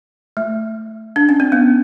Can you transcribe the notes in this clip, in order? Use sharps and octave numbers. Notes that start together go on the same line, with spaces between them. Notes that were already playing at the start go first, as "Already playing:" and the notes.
A3
D4
C#4
C4
B3